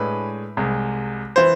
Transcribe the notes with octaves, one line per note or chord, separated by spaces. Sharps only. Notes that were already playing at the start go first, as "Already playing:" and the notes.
Already playing: A2 G#3 D4 B4
C2 C3 G#3
E3 C5